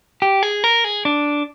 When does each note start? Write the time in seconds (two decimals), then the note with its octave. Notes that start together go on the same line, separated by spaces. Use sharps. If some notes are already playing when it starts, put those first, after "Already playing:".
0.22 G4
0.43 G#4
0.64 A#4
0.84 G#4
1.05 D4